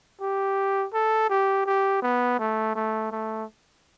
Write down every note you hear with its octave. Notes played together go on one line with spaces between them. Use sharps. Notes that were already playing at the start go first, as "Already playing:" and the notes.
G4
A4
G4
G4
B3
A3
A3
A3